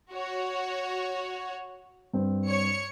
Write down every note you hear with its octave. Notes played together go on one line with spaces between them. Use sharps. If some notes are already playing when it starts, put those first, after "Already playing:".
F#4 C#5
G2 C4
C#5 C#7